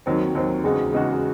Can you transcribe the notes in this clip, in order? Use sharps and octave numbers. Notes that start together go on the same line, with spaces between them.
D#2 D#3 F#3 C4
D#2 D#3 F#3 C4
E2 C#3 G#3 D#4 F#4
E2 C#3 G#3 D#4 F#4